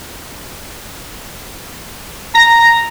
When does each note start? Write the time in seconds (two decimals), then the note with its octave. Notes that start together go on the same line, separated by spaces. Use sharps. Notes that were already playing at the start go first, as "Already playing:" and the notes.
2.35 A#5 A#6